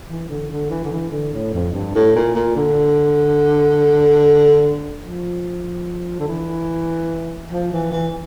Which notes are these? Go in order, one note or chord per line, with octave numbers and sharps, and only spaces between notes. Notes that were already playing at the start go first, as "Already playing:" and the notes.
E3
D3
D3
E3
D3
E3
D3
A2
F2
G2
A2
A#2
A#2
D3
F3
D3
E3
F3
E3
E3